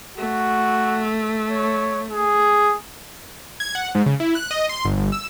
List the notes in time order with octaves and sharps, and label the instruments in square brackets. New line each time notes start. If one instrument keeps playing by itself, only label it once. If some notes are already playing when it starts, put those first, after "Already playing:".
[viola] A3 [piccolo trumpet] F#4
[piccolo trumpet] C#5
G#4
[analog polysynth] G#6
F#5
G#2
C#3
E4
F#6
D#5
C6
G1
G1
E6